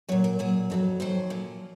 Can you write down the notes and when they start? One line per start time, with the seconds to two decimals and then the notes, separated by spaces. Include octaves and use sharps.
0.09 F#3 C#5
0.12 A#2
0.24 A#4
0.39 A#2 F#3 G#4
0.70 F2 D#3 F#3
1.00 F2 D#3 F#3 C5
1.30 A#2 F3